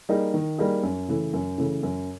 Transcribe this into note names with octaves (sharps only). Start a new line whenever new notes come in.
G3 A#3 D#4 G#4
D#3
G3 A#3 D#4 G#4
F#2
C#3 E3 A3
F#2
C#3 E3 A3
F#2